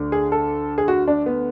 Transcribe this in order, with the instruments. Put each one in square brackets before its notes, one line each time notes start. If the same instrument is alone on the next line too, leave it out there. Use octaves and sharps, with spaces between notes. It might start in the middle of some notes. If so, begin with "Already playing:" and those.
Already playing: [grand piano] D2 D3
G#4
A4
G#4
F#4
D4
B3